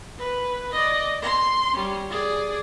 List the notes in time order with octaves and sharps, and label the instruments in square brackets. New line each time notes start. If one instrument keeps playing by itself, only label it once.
[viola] B4
D5 D#5
C6
G3 C#4
G#4 D5